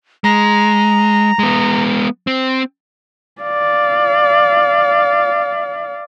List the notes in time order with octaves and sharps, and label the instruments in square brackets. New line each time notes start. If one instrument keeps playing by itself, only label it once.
[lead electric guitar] G#3 [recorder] A#5
[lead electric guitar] G#3 B3
C4
[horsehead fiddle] D5 F5